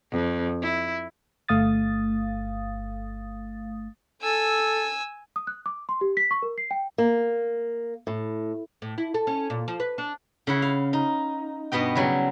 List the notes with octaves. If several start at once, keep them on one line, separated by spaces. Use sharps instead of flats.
F2
E4
G1 A3 F5 D#6 A6
A4 G#5 E6
D#6
F#6
D6
C6
G4
B6
C#6
A#4
C7
G5
A#3
A2
A2
E4
A4
C#4
A#2
F3
B4
D4
C#3 E4 F#5
F5
D#4
G2 B2 B3 D#5 G5
C#3 F#3 G3 E4